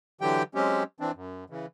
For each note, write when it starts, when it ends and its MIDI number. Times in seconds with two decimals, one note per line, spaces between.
0.21 0.43 50
0.21 0.43 52
0.21 0.43 54
0.21 0.43 67
0.21 0.43 79
0.55 0.83 54
0.55 0.83 56
0.55 0.83 60
0.55 0.83 61
0.55 0.83 67
1.00 1.11 52
1.00 1.11 60
1.00 1.11 62
1.15 1.44 42
1.50 1.66 49
1.50 1.66 52